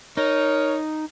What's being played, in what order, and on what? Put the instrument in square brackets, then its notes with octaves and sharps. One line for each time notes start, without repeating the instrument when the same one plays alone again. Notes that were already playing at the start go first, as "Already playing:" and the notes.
[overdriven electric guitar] D#4 [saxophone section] A#4 C#5